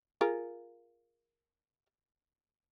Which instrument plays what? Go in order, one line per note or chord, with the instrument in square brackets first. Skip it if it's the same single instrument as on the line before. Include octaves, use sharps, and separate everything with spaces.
[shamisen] F4 G#4 A#4